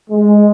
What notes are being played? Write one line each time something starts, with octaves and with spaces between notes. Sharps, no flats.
G#3